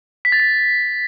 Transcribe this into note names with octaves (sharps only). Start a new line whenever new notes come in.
B6
A6
B6